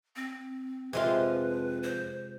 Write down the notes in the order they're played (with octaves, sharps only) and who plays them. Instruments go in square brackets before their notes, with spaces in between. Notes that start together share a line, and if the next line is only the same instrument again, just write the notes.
[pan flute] C4
[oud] F2 F3 [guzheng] C3 G#3 F4 [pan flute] B4
[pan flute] C5